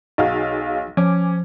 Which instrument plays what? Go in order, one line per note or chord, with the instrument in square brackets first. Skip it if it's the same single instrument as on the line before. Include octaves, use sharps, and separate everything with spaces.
[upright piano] B1 F5 [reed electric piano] D#4 F#4 G#4
[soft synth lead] F3 [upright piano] C#4 [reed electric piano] G#5 D6